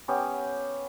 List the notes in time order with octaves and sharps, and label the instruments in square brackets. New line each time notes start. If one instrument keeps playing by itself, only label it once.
[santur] B3 C#4 G4